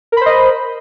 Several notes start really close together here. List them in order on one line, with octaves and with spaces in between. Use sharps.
A#4 B5 C5 D#5